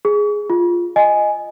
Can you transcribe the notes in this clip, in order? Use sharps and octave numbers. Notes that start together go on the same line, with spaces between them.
G#4
F4
D#5 G#5